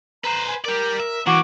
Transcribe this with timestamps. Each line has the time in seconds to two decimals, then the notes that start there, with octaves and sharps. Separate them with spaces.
0.24 B4 C5 A#5
0.48 G#5
0.65 G4 A#4 D5
1.00 E5
1.27 E3 A#3 F#4 F#5 D6